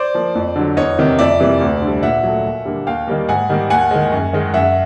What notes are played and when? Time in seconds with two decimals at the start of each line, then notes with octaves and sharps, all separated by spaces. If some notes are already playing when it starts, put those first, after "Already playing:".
Already playing: C5 D5
0.14 F3 A#3
0.36 F2
0.56 D3 F#3
0.77 E2 C#5 D#5
0.99 C3 D#3
1.19 F2 D5 E5
1.40 C3 E3 G3 A#3
1.61 D2
1.82 D3 G3
2.03 A#2 E5 F#5
2.24 F#3 A3
2.45 D#2
2.65 D3 G3 A#3
2.87 D#2 F5 G5
3.07 D#3 G3 A#3
3.29 G#2 F#5 G#5
3.49 D#3 G3 A#3
3.70 D#2 F#5 G#5
3.91 D#3 G#3
4.12 F#2
4.33 D#3 G#3
4.54 F#2 E5 F#5